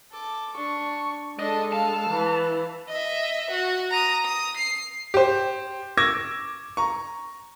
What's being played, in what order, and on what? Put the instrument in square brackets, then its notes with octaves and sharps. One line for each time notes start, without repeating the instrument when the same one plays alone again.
[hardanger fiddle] A4 D6
[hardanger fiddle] D4 [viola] C#6
[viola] G#3 A4 [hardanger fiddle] D4 [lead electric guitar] D#5
[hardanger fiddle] F5 [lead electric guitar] A5
[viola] E3
[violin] D#5 E5
F#4
A#5 D#6
D#6
C7
[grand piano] G4 C5
C#6 D6 E6 G#6 A#6
A#5 C#6